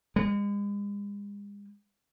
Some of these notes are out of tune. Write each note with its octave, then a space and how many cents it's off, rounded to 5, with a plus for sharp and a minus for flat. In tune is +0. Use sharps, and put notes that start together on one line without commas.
G#3 -40